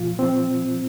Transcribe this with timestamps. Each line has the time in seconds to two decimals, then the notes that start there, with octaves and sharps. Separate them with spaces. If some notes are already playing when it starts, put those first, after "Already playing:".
Already playing: A#2 F3 F4
0.19 C4